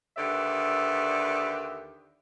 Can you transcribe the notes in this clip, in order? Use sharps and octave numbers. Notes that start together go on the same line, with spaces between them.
D#2 D3 G4 B4 D5 E5